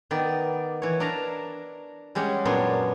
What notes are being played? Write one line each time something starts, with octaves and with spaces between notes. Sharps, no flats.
D#3 B3 D5
E3 C#5
D4 A#4 A5 A#5
G3 G#3 C#4 G4 F#5
F#2 A#2 B3 D4 C#5 C6